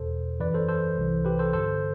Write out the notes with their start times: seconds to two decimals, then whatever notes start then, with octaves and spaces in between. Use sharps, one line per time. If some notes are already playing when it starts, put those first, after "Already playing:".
Already playing: E2 B2 A4 C5
0.40 F#2 E3 B4 D5
0.54 A4 C5
0.68 A4 C5
0.98 C2 C3 E3
1.25 G4 B4
1.39 A4 C5
1.53 G2 D3 A4 C5